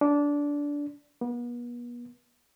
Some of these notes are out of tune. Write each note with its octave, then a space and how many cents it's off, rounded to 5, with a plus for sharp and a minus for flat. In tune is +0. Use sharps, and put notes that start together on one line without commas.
D4 -20
B3 -40